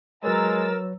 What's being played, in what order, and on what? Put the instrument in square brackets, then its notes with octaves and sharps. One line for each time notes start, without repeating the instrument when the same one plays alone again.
[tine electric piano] F#3 B4 C#5 [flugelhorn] G#3 [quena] A#4 [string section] A#5 E6 A6